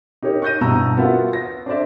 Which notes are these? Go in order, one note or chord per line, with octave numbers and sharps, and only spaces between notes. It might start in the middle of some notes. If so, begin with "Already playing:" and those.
D#4 G4 A#4 C#5
C#6 F#6 G6 A#6 D#7
G2 B2 E4 A5 A#5 E6
B3 F4 F#4 A#4 E5 F#5
A#6
D4 A4 C5 D5 E5